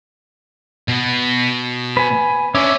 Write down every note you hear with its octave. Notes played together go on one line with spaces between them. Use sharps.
B2
B4 G#5
C#4 D4 C#5 E5 D6